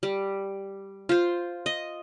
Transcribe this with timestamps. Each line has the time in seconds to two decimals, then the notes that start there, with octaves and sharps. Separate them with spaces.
0.03 G3
1.09 F4 C5
1.66 D#5